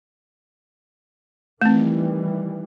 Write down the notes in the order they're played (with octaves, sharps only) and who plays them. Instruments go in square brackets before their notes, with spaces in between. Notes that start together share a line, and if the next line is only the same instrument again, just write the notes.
[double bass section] D#3 E3 G3 [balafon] A3 C4